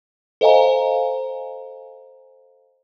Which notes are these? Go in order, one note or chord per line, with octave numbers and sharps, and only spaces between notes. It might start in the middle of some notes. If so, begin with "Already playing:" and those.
A4 C5 D#5 F5 G#5 A#5